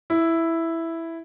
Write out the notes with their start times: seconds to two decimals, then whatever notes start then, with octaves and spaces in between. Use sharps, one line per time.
0.10 E4